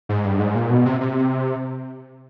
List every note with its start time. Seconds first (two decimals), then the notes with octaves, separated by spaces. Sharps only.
0.09 G#2
0.25 G2
0.39 G#2
0.55 A#2
0.70 B2
0.85 C3
1.01 C3